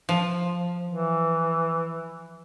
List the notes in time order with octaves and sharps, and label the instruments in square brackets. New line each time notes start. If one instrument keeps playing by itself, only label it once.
[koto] F3
[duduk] E3